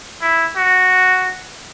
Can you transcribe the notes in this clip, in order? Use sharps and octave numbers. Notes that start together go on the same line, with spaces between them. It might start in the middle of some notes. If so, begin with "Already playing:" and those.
E4
F#4